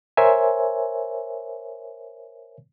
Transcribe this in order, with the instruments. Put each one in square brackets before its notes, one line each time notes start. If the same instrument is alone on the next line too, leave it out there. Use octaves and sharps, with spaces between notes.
[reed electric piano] A#4 C5 C#5 E5 G#5